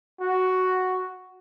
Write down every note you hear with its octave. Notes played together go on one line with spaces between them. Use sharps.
F#4